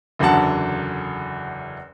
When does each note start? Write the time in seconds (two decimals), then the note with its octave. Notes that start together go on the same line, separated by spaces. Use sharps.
0.19 F#1 E2 D3 F#3 F#5 A5